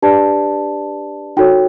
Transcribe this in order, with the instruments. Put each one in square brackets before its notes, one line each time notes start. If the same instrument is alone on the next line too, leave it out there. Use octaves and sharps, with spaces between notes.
[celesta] D4 G4 B4 D5 A5
D#4 F#4 A4 C#5 G5